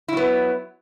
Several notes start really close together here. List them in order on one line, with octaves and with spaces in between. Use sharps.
E4 F#3 B3